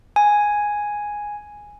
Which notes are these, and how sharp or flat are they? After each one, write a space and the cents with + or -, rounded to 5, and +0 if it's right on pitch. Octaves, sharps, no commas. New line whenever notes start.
G#5 -5